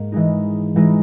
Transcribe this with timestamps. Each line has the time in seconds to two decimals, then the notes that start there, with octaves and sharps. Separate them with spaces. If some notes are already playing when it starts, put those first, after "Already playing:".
Already playing: G#2 A#3
0.12 E3 G#3 D#4
0.76 E3 G#3 D#4